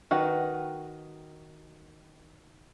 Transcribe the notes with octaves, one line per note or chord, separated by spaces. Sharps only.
D#3 F#4 B4 F#5